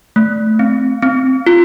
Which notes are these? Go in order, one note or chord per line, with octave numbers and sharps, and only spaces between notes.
A3
C4
C4
F4